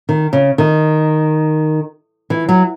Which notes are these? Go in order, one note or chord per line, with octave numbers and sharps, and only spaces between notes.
D#3
C#3
D#3
E3
F#3